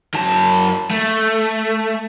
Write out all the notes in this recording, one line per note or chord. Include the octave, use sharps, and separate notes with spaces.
F#2 A5
A3